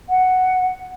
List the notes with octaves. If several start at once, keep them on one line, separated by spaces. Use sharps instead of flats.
F#5